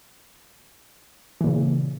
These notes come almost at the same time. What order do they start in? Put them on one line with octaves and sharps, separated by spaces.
E3 A#2 C#3